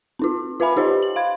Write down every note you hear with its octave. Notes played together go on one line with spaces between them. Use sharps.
C4 D#4 F4
F4 B4 E5 G#5 B5
D#4 F4 G4 C5 D#5
F#7
F5 C6 G#6